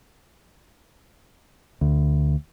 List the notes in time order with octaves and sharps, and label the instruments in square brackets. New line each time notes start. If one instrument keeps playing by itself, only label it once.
[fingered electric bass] D2